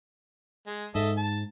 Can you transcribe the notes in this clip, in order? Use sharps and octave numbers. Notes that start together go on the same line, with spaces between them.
G#3
G#2 A4 D#5 E5
A5